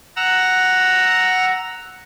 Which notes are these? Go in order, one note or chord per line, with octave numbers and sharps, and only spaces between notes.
F#5 A#5 E6